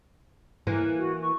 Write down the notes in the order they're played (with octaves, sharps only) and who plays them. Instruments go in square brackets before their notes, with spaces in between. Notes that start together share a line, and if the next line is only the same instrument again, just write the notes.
[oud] E3 A#3
[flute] F#4
C#6